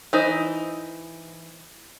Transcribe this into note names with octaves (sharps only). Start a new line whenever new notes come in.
E3 D#4 C5